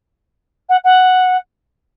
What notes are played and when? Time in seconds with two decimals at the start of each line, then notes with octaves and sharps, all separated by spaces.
0.69 F#5
0.84 F#5